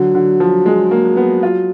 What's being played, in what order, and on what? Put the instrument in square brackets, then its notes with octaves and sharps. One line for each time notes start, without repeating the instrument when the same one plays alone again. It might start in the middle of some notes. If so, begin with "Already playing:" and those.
Already playing: [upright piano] D3 [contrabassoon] F#3
[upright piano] D3
F3
G#3
A#3
B3
F4